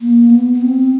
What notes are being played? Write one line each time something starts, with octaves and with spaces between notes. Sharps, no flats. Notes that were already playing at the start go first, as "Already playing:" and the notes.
A#3
B3
B3
C4